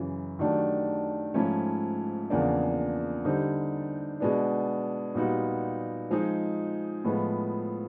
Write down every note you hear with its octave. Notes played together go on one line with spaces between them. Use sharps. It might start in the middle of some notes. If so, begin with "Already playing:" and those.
Already playing: F#2 C#3 E3
D#3 F#3 A3 D4 G4
G#2 F3 A3 C#4 E4
E2 C#3 F3 A#3 D4
D3 G3 C4 D#4
B2 G#3 B3 D4
A#2 G3 B3 D#4 F#4
F3 G#3 C4 D#4 G#4
A2 F3 G#3 B3